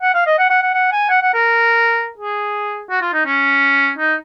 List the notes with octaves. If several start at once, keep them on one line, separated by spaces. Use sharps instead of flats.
F#5
F5
D#5
F#5
F#5
F#5
F#5
G#5
F#5
F#5
A#4
G#4
F#4
F4
D#4
C#4
D#4